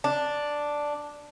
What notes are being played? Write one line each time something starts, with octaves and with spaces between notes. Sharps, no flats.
D4